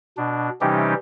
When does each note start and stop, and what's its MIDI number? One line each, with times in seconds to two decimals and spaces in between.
0.17 0.50 47
0.17 0.50 62
0.61 0.94 48
0.61 0.94 52
0.61 0.94 55
0.61 0.94 61
0.61 0.94 63
0.61 0.94 67